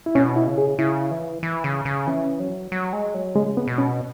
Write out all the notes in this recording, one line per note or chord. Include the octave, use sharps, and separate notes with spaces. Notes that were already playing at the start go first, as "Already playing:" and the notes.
E4
B2 C#4
E4
C#3
G#4
C#3 E4
E3
E3
C#3
C#3
E3 C#4
F#3
F#3
G#3
F#3
C#3 G#3
B3
B2
C#4